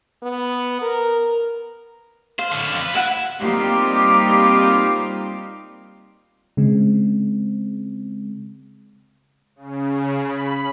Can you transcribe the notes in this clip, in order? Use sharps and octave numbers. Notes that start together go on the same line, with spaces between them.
B3
A#4
C5 F5
A2 D3
F2 D3
B4
E4 F5 F#5
G3 A#3 C4 D#4 F4 G4
C#3 G#3 C4
C#3
B5